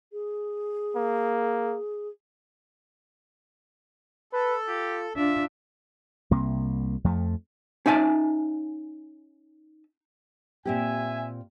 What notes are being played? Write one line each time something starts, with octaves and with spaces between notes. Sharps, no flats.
G#4
A#3
A4 B4
F4 G4
D4 F4 E5
C2 C3 A#3
F2 F3 A3
C#4 D#4 E5 G#5 A5
A#2 C4 G4 E5 G#5